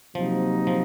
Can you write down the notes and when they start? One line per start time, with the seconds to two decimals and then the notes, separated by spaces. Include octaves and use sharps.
0.15 C3 F3 F#3 A#3 D#4
0.67 F3